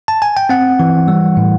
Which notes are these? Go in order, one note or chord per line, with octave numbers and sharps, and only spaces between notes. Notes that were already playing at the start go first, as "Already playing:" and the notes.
A5
G#5
G5
C4 F#5
E3
G3
A2